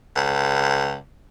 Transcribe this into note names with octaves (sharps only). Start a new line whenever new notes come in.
C#2